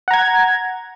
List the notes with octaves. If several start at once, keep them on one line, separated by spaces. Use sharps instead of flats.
F#5 A#5 G#6